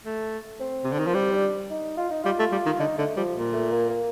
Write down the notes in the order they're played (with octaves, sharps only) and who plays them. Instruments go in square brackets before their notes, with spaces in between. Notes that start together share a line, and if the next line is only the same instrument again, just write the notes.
[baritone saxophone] A3
[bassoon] C4
[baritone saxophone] C3
D3
D#3
[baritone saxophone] F3 [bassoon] A#3
[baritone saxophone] G3 [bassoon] C4
[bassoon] D4
D#4
F4
D#4
[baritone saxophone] G3 [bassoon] F4
[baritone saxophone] A3
G3
D#3
[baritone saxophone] D3 [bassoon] D#4
[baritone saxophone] D3 [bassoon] A3
[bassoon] F3 [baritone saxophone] G3
[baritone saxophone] A#2
[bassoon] A3
A#3
A#3